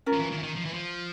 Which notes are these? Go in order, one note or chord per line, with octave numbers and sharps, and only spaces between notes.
C#4 F4 A#4
F3
E3
D#3
E3
D#3
F3
E3
F3